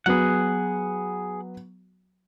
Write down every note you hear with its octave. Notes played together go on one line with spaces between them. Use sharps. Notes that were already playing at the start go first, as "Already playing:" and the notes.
F#3 B3 G#4 F#5